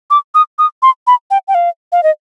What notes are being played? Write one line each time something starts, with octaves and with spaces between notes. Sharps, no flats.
D6
D#6
D#6
C6
B5
G5
G5
F5
F5
D#5